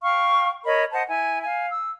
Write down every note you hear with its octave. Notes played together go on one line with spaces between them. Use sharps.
F5 G5 C#6 F6
A#4 C#5 D#5 B5
C5 D#5 F#5 A5
E4 G#5
F5 G#5
E6